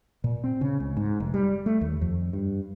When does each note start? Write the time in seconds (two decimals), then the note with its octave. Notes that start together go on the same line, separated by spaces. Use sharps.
0.24 A#2
0.44 C4
0.61 C#3
0.80 C#2
0.97 G#2
1.20 F1
1.34 G3
1.66 A3
1.81 D#2
2.01 F2
2.33 G2